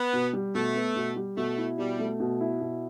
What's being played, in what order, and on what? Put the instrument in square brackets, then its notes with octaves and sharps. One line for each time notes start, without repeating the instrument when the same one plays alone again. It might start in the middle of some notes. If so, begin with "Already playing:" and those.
Already playing: [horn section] B3
[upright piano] B2
G3
[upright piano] B2 [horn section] A3
[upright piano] B3
B2
G3
[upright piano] B2 [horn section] A3
[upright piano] E4
[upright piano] B2 [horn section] G3
[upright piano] A3
B2
E4
B2